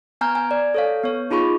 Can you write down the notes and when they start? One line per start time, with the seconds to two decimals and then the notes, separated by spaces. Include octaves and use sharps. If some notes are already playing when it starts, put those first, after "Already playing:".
0.21 B3 G#5 A#5 F6 G6
0.35 G#5
0.51 D5
0.74 A4 C#5 F5
1.03 B3 C#5
1.31 D#4 F4 G#4 B5 C#6